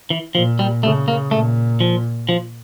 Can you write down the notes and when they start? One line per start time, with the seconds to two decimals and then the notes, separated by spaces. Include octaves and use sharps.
0.10 E3
0.35 A#2 F3
0.59 G3
0.83 C#3 A3
1.08 A#3
1.31 A#2 A3
1.80 F3
2.29 F3